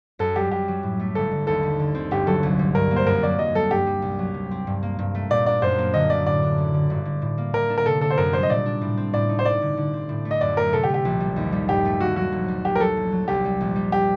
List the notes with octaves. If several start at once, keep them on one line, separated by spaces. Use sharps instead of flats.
F#2 A4
G3 G4
F#2 G4
F#3
A2
A3
G1 A4
D3
D#2 A4
G3
D3
C4
G1 G4
F#3 A4
C2
G3
G2 A#4
A#3
C5
F#2 A#4
F#3 D5
F#2 D#5
G3 A4
G2 G4
G3
C2
F#3
C3
C4
G2
A#3
G2
A3
A#2 D5
D4 D5
F#2 C5
A#3
D3 D#5
A3 D5
A2 D5
D4
F#1
D3
G1
D3
A2
A#3
D3 A#4
D4
A#4
C3 A4
D4 A4
C5
F#2 A#4
G3 C5
D#5
A#2 D5
D4
A2
C4
A2 D5
D#4
C5
G1 D5
D3
D3
C4
A2
A3
D#5
F#2 D5
A3 A#4
C3 A4
G4
A3
G4
A#1
G3
D#2
G3
G2 G4
A3
D#2 F#4
F#3 F#4
A#1
G3
A#1 G4
A#4
F#3 A4
A#1
F#3
C2 G4
G3
A#1
G3
G4